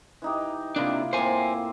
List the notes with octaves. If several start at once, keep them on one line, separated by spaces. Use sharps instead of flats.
E3 D#4 G4
C3 A#3 D4 E4 F4
A2 A#3 C4 C5 G#5